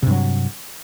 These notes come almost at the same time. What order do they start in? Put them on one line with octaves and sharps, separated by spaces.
C3 G2 F#3